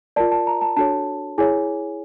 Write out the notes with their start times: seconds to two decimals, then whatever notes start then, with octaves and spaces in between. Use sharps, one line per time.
0.16 F4 A#4 D5 A5
0.32 A5
0.47 A#5
0.61 A5
0.77 D4 F#4 A4 C#5 A5
1.38 E4 G#4 C#5 G#5